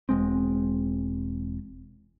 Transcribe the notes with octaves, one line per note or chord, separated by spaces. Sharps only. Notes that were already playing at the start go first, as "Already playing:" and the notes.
E1 G#3 C4